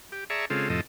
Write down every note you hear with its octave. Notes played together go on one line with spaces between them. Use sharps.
G4
G#4 D5 E5 A5 A#5 C#6
C#3 G#3 C4 F4 A4
F2 A2 C3 F3 A4 D#5